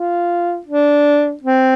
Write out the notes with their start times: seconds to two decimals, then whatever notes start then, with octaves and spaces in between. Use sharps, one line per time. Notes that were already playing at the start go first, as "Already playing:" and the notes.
Already playing: F4
0.67 D4
1.43 C4